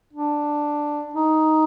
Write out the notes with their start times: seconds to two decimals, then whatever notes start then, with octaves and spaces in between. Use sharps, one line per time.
0.13 D4
1.14 D#4